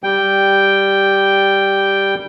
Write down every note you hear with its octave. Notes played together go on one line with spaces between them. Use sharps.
G3 G5